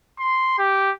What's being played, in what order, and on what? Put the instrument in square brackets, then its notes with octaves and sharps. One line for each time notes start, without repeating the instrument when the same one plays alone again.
[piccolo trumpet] C6
G4